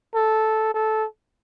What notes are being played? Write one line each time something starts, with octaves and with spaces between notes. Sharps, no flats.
A4
A4